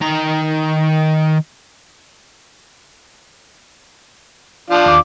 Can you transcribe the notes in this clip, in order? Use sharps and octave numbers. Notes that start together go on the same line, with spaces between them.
D#3 A#5
F3 D4 F5
D#2 D6